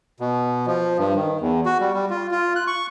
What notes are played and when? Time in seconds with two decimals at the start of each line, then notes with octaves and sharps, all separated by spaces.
0.20 B2
0.67 F3
0.99 G2
1.16 D#3
1.40 E2
1.66 F#4
1.80 G3
1.94 G3
2.10 F4
2.31 F4
2.56 F#6
2.67 C#6